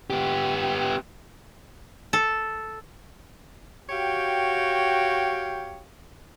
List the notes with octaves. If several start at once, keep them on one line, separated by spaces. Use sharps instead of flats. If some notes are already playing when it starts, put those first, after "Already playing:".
B3 G4
A4
F#4 G4 C#5 F5 G5